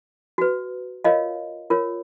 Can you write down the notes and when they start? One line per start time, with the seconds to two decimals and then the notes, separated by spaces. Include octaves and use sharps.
0.38 F#4 B4
1.04 F4 A#4 C#5 D#5 F5
1.70 F4 A#4 C#5